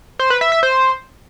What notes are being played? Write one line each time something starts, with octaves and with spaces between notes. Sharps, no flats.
C5
B4
E5
E5
C5